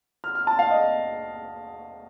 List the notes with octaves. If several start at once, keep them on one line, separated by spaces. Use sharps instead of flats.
F6
F6
A5
F5
D#5